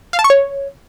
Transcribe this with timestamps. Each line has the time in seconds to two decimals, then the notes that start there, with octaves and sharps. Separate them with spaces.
0.13 F5
0.19 A5
0.24 C#6
0.30 C#5